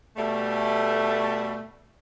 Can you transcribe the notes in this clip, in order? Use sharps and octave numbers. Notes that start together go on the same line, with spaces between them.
B2 G3 A3